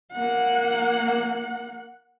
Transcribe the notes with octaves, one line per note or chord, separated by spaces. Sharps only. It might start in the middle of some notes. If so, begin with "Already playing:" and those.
A#3 F#5